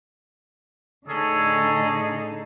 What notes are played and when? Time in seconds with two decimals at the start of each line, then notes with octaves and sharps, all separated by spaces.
1.07 A2 D3 C#4 D#4 G#4 A4